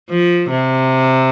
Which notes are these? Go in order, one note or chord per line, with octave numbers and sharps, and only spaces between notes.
F3
C3